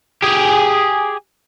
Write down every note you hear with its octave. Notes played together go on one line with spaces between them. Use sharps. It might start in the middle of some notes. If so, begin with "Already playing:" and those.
G4 G#4